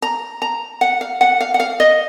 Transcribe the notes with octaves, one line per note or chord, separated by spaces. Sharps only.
A#5
A#5
F#5
F5
F#5
F5
F#5
F5
D#5